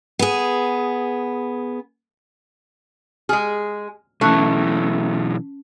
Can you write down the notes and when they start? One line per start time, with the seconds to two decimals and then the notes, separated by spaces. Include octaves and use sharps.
0.19 B3 G#4
3.29 G#3 G#4 F6
4.21 B1 E3 A3 C#4 A5 F#6